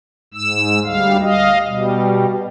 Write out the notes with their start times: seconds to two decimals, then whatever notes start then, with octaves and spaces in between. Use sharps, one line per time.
0.34 G#2 E6
0.84 D2 G3 F5
1.22 D#5 F5
1.66 B2 G3